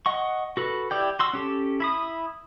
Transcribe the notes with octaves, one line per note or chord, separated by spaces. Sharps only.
D#5 F#5 C#6
F#4 A4 B4
E4 G4 D5 G5
F#4 C6 E6
C#4 G4 A4
E4 B5 D#6